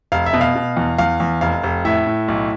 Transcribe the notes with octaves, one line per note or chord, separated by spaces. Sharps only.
F1 F5
E5
B2
F5
B2
E2
E2 F5
E2
F1 F5
F1
A2 E5
A2
B1